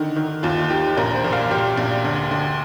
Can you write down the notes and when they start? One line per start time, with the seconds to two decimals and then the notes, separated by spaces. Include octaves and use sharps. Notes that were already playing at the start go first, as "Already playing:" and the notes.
Already playing: D3 D#3
0.16 D#3
0.43 D#2 F4
0.70 D#3 G4
0.97 A#1 A#4
1.15 C5
1.24 A#2
1.33 F5
1.51 A#2 G4
1.77 A#1
2.05 D2
2.31 D2